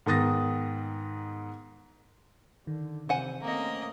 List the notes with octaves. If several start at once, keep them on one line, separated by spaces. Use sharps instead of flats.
G#2 D#3 B3 D#6 A6 A#6
D3 D#3
C3 E3 C5 F#5 G#5
A3 A#3 C4 C#4 D#5